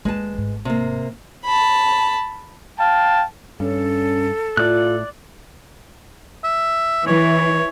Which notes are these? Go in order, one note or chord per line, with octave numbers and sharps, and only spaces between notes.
D#2 G#3 A#3 B4 A5
G#1 G#2
C3 A#3
A5 B5
F5 G5 A5
G2 C#4 A4
A2 F4 D5 F#6
E5
E3 C#5